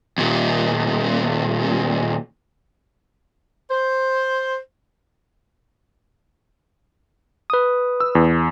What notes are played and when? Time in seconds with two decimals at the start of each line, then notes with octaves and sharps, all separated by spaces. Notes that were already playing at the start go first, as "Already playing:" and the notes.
0.18 D#2 A#2
3.71 C5
7.50 B4 D#6
8.00 E6
8.15 E2